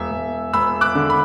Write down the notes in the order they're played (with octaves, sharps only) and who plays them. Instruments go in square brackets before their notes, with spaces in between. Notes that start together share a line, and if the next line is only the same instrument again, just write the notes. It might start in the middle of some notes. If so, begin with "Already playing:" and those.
Already playing: [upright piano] E1 E5
E1
E1 B5 E6
D6 F#6
D3
B5